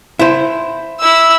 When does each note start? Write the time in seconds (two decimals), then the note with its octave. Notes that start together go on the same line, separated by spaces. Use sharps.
0.19 E4 C5
1.00 E4 E6